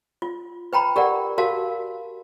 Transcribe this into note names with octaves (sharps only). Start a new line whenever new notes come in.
F4
B4 G5 A#5 B5
G4 A#4 D5 F#5
F#4 A#4 F5 A5